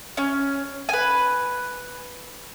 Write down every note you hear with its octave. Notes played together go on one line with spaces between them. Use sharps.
C#4
B4 G#5